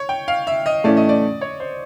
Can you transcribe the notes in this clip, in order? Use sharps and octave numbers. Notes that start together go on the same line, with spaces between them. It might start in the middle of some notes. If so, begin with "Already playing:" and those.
Already playing: C#5
G5
F5
E5
D#5
A2 E3 A3 C#4 D5
D#5
D5
C#5
C5